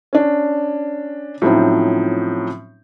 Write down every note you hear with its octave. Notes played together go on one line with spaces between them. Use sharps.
C#4 D4
A2 F3 F#3 C4 C#4 D#4